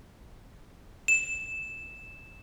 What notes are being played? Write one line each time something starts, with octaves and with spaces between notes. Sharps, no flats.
E7